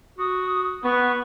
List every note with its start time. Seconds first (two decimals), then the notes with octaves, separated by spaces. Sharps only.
0.18 F#4 D#6
0.84 B3 B4 C#6